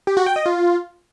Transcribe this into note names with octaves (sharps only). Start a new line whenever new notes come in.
G4
F#4
G5
D#5
F4